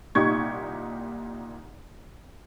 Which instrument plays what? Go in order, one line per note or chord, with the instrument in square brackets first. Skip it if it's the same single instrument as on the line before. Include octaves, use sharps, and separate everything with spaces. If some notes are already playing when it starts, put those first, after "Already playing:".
[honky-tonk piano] C2 A#2 D#4 G4 C#6 G#6